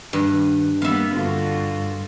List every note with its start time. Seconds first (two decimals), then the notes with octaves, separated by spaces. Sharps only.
0.13 G2 D#3 B4
0.82 G3 A#3 B3 E5 F5
1.13 G2 D3 F4 F#4